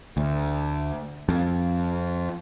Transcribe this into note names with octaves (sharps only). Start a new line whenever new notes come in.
D2
F2